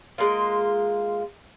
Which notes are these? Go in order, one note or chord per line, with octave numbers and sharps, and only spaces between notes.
G#3 A#3 F4